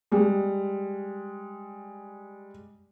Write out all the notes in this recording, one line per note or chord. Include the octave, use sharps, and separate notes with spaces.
G3 G#3